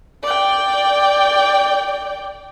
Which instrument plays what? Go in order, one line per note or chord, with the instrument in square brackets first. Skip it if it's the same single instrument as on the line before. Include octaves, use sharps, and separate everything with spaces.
[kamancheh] D5 G5